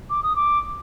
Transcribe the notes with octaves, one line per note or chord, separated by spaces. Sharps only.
D6
D#6
D6